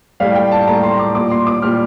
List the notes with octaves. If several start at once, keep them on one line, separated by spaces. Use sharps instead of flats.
A2 G3 F5
G5
A5
A2 G3 A#5
C6
D6
A#2 G3 D6
C6
D6
A#2 G3 F6